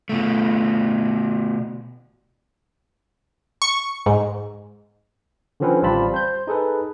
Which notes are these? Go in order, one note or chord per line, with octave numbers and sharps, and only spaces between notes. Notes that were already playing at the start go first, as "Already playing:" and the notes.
B2 A3
C#6
G#2
D3 D#3 F3 C4 C#4 B4
A1 G3 C4 F4 A5 B5
C5 G6
D#4 G#4 A4 B4